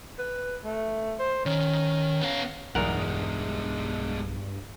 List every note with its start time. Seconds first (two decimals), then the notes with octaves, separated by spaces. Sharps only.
0.19 B4
0.65 A3
1.19 C5
1.46 D#3 C#4
2.21 B3 F5
2.75 B1 E2 G2 B2 G#3 A#4 F#5